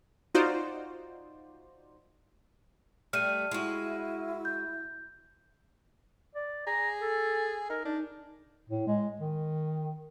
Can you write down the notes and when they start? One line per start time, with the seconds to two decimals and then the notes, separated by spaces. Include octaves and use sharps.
0.34 D#4 F4 F#4 C5 D5
3.13 G3 A3 F6 D#7
3.51 G#3 E4 F#4
4.45 G6
6.35 D5
6.67 G#4 A#5
7.01 A4
7.70 D#4 A#4
7.85 D4 D#4
8.69 A2
8.87 G#3
9.20 D#3